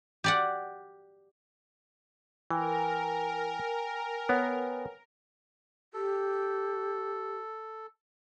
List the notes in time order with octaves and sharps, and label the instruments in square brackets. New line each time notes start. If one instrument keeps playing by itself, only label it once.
[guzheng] G4 D5 F#5
[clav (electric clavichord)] E3 [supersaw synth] A#4 [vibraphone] G5 G#5
[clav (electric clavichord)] B3 [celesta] B4 C#5 F#5
[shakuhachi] G4 [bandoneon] A4